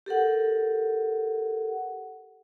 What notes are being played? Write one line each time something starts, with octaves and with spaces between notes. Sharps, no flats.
G4 A4 A#4 F#5